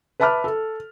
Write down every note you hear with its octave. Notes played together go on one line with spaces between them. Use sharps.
B4 E5 A5 B5 D6 F6
A4